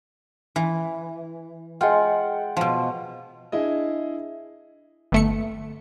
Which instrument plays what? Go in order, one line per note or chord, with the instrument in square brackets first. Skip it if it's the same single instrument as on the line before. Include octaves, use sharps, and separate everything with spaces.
[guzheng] E3
[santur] G#3 F#5 G5 [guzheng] F4
[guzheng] B2 F3
[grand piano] D4 E4 G#4 D#5
[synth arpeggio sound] G1 A3 C#7